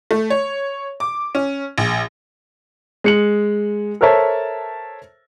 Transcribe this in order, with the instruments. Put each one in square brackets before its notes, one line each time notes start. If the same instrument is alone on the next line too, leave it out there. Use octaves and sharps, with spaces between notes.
[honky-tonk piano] A3
C#5
D6
C#4
A#1
[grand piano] G#3 C#7 F#7
A4 A#4 C5 C#5 E5 A5